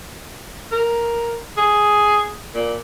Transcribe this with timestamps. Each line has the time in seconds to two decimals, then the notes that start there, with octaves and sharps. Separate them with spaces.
0.72 A#4
1.57 G#4
2.54 A#2